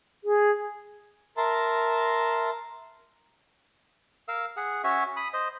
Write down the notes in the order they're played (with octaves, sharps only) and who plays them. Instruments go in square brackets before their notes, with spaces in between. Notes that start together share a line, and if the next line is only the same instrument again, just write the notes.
[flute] G#4
[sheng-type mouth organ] A#4 E5 A5 A#5 C6
[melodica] A#4 F5 E6
G#4 F#5
C#4 F#4 C#5 E5
B5 D#6
C5 D#5